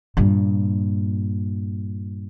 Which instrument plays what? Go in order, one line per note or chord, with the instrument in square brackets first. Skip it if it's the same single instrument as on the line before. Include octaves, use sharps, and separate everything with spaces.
[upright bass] G2 A#2